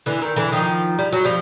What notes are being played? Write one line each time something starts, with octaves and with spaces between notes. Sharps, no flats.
D3 E3
D#3
D3 E3
D#3 F3
G3
F#3
F3 G3